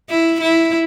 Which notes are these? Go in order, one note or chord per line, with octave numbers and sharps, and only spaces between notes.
E4
E4